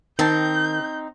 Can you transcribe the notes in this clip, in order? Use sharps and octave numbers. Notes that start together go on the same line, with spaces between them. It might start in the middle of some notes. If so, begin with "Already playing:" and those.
D#3 C4 D#4 A5 G6